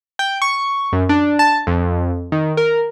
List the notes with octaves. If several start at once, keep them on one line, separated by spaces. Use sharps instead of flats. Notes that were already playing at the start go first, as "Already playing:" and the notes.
G5
C#6
F#2
D4
A5
F2
D#3
A#4